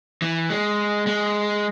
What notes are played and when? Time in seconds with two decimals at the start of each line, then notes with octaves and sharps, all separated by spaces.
0.22 E3
0.50 G#3
1.07 G#3